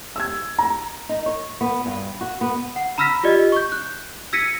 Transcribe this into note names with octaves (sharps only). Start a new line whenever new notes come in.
E6 G#6
A#5
D#4
C#5
B3
G2
F#4
B3
F#5
A#5 B5 E6 F6 A#6 B6
F4 G4 D5 D#5
C#6 G6
F#6
E6 G#6 A#6 B6 C#7 D#7